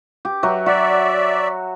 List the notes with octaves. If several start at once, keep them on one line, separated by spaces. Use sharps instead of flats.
G4
F#3 E5
F#4 D5 E5